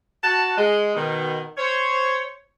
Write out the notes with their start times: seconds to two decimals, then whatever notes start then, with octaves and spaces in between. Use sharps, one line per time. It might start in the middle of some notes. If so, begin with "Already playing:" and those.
0.23 F#4 A5
0.57 G#3
0.95 B2 D#3
1.57 C5 C#5